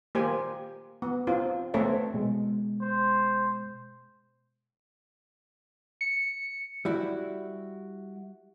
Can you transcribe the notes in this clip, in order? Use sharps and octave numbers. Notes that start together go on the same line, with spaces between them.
A#3 G4 C5 G#5
B3
C4 F4
A3 B3 C4 A4 C#5 E5
B2 G#3
C5
C#7
G3 E4 F#4